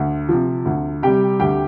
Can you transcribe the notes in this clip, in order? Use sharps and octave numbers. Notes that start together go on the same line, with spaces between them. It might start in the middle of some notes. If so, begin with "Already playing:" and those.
Already playing: D2
C3 F3
D2
C3 G3 G4 G5
D2 G4 G5